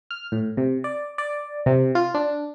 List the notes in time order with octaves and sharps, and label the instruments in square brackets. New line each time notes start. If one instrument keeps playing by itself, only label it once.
[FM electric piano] F6
A2
C3
D5
D5
C3
F4
D4